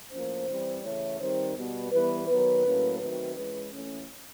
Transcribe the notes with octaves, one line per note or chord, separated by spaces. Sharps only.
A2 F3 A#3 C#4 C5
E3 G3 C4
C#3 E3 A3 C#5
D#3 G3 C4 C5
B2 G3 B3
E3 G3 B3 B4
D#3 F#3 B3 B4
A2 F#3 A#3 C#4
D#3 F#3 A3 C4 B4
E3 G#3 C#4 B4
E3 A3 C#4